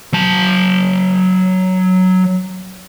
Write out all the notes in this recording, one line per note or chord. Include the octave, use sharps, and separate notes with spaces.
F#3 A5